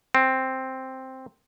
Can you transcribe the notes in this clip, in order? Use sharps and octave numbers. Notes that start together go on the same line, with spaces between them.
C4